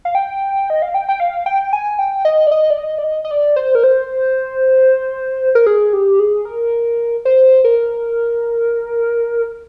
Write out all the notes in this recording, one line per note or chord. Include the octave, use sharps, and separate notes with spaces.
F5
G5
D#5
F5
G5
G5
F5
G5
G#5
G5
D#5
D5
D#5
D5
D#5
D5
D#5
D#5
D5
C5
A#4
C5
A#4
G#4
G4
G#4
A#4
C5
A#4